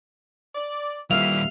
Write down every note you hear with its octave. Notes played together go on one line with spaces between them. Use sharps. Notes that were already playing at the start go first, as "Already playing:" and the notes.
D5
D#2 D3 E3 F3 G3 E5 F5 F7